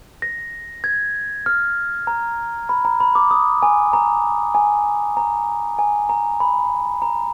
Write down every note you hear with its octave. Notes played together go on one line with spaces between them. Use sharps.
A#6
G#6
F6
A#5
B5
A#5
B5
D6
D#6
G#5
A#5
G#5
A#5
G#5
A#5
B5
A#5